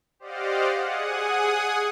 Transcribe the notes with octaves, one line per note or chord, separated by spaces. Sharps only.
G4 C5 D5 D#5 F5 F#5
G#4 F#5 G#5 D#6